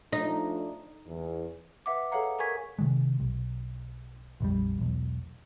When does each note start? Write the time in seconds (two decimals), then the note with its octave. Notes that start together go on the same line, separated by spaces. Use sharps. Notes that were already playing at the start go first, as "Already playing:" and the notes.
0.13 F3 A3 D4 D#4
1.06 E2
1.86 B4 E5 F#5 D6
2.12 G#4 A4 C#5 F5 F#5 A#5
2.39 G#4 A#4 G#5 C#6 G#6 B6
2.79 C3 D#3 G#3
3.20 B1
4.40 A#1 F2 C#3 G3
4.79 E1 B1